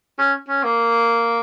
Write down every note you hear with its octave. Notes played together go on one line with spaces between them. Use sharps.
C#4
C#4
A#3